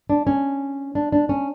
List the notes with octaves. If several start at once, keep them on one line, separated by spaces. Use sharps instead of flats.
D4
C#4
D4
D4
C#4